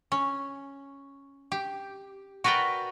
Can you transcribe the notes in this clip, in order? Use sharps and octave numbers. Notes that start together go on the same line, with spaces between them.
C#4
G4
F#4 A#4 B4 D5 G5